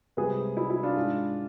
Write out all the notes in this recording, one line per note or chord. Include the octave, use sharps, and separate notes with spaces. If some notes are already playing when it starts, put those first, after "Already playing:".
C2 C3 G#3 G#4 B4
E4
E4
D4 F4
G#2 G#3